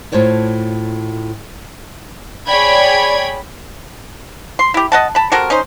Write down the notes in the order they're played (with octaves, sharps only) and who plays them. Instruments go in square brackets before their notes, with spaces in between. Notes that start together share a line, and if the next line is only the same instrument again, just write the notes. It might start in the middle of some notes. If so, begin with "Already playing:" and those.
[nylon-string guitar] A2 F4 C5 C#5 A5
[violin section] G#4 C#5 D5 G5 B5 G#6
[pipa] C6
E4 G4
D#5 F#5 A5
A5 B5
C3 F#4 A4 A#4
C#4 D#4 C5